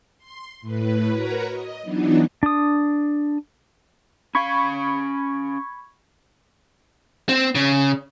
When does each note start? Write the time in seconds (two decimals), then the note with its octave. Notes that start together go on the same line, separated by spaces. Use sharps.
0.18 C6
0.62 A2 B4
1.09 F#4 A#4 B4 C#5 A#5
1.48 D#5
1.83 E3 F#3 B3 D4 D#4
2.43 D4 D#6
4.35 C#4 F5 B5 C#6 G#6
7.29 C4
7.55 C#3